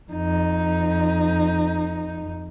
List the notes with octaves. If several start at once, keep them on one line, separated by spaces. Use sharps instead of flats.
F2 D#4